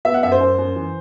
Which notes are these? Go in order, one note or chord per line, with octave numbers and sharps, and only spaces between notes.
B3 E5
F#5
F#2 E5
C5
F#2
F#2
E3